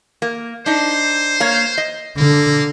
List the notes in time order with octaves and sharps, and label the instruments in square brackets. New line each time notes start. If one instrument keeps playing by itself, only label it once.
[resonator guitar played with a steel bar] A#3
[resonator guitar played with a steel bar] D4 D#4 [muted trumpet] C5
[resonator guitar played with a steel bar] A#3 C#5 F5
D#5
[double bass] D3 [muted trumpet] A#3